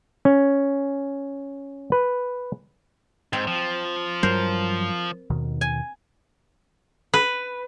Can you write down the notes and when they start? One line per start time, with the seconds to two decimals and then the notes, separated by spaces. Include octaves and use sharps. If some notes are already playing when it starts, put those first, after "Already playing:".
0.25 C#4
1.92 B4
3.33 G#2 C4
3.47 F3
4.23 G2 F#3 G3 A#4 C5
5.30 D#2 B2 D#3
5.61 G#5
7.14 B4